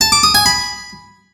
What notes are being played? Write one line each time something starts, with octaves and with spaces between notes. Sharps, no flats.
A5
D6
D#6
G#5
B5